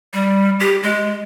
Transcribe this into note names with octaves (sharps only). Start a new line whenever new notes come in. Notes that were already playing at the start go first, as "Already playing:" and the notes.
G3
G4
G#3